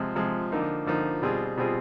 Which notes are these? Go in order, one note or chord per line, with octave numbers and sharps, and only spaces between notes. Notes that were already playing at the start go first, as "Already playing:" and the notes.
Already playing: C3 F3 G#3
C3 F3 G#3
D3 F3 A#3 D#4
D3 F3 A#3 D#4
B2 G3 C4 F4 G#4
B2 G3 C4 F4 G#4